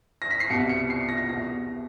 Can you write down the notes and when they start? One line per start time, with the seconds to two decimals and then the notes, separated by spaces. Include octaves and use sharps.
0.22 A#6
0.31 B6
0.40 C7
0.50 C2 B2 C#7
0.69 C#7
0.90 C7
1.09 A#6
1.29 E2 B2 A#6